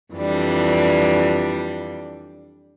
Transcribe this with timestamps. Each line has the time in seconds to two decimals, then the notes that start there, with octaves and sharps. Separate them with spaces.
0.14 F2 E3 G3 D4